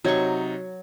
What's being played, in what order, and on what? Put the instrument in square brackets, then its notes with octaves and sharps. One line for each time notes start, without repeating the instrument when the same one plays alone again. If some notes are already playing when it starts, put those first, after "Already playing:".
[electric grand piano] C3 D#4 G#6 [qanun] F#3 C#6